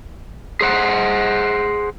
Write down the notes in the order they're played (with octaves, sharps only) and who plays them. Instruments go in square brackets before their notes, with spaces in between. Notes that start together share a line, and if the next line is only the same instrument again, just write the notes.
[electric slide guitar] G#4 C5 F#5